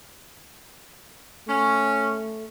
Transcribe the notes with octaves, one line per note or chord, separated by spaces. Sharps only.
A3 C#4